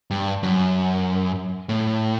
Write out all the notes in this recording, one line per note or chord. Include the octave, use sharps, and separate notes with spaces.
G2
F#2
A2